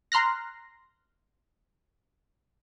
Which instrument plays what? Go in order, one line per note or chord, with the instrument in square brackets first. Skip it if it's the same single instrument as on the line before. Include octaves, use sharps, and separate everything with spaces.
[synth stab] A#5 C6 F6 F#6 A#6